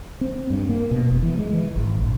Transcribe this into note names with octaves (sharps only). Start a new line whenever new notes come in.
C4
G2
A#3
B2
F1
E3
G#3
E3
G#1
A#1